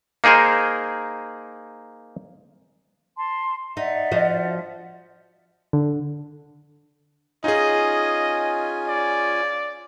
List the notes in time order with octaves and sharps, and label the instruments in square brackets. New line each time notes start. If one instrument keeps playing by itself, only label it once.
[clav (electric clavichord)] A#3 D#4 G#4 A#4 C5
[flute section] A5 C6
[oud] D#4 [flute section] D5 E5 F#5
[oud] F3 F#4 D#5
[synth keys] D3
[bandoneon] C#4 F4 G#5 [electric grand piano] D#4 G#4 [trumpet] D#5
[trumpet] D5